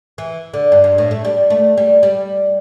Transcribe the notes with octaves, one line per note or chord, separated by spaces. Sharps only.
E3
D3
G2
G2
A2
A3
G3
A3
G3
G3